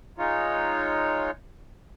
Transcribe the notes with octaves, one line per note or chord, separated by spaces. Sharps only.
G#3 D#4 F4 C#5